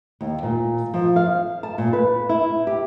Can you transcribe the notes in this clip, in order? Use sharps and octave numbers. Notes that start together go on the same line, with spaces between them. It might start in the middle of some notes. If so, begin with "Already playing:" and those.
D#2
A#2
F3
F5
A5
A#2
B4
E4
G4